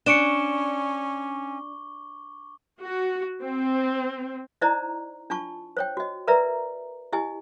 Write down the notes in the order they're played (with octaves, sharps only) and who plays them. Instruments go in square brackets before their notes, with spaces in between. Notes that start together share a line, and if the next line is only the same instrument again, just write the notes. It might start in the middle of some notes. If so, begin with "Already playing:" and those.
[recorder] C#4 [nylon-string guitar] D4 [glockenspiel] C#6 D6 G7 [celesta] C#7 D7 E7
[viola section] F#4
C4
[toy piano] D#4 E4 C5 D5 D#5 A#5
D4 F4 A5 C#6
C5 C#5 G5
F#4 D#5
A#4 B4 D5 E5 A#5
E4 G4 D#5 G#5